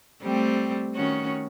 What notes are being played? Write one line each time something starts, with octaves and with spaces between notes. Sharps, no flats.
G3 A3 C4
D#3 C#4 F#4